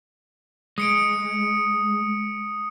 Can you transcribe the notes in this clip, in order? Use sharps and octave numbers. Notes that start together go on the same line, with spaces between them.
G#3 D#6 C#7 D7